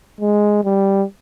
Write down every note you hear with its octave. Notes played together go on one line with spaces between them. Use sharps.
G#3
G3